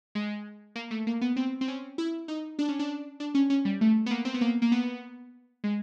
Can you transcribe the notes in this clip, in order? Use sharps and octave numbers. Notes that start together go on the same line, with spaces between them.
G#3
A#3
A3
A#3
B3
C4
C4
C#4
E4
D#4
D4
C#4
D4
D4
C#4
C#4
G3
A3
B3
A#3
C4
B3
A#3
A#3
B3
G#3